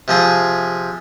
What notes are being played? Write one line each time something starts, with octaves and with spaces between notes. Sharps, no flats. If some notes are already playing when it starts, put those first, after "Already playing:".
C3 F3 G#4